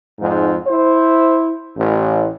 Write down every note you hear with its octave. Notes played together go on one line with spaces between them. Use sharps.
F2 G#2
E4 C5
A1